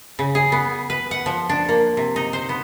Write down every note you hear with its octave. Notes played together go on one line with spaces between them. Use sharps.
C#3
G#4
B3
B4
F#5
F3
D4
A#3
C3
D#4
C5
B3